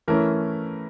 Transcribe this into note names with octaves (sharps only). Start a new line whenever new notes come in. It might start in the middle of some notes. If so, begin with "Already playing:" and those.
E3 A3 C#4 E4 A#4